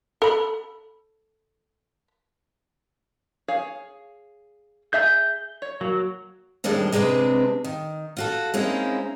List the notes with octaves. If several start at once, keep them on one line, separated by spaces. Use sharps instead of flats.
A4 B5
G#4 C#5 F5
G#4 E5 A#5 G6
C#5
F#3 A#3
F2 A2 D#3 G3 G#3 D4
C3 G#3 C4 D4 B4
D#3
F4 F#4 A4
G#3 A#3 C4 C#4 D#4 E4